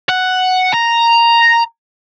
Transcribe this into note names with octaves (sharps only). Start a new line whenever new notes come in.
F#5
A#5